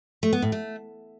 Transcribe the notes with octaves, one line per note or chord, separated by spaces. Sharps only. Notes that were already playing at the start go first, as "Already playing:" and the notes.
A3
B3
A2
A3